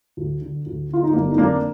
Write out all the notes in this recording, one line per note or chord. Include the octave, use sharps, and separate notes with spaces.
D2
D3
D2
D3 F4
D#4
G1 A#3 D4
D#4
F2 D3 A#3 D4